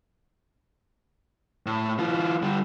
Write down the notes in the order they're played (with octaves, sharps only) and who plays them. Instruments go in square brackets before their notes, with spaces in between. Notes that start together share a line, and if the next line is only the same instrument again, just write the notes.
[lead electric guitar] A2
E3 F4
D3 G3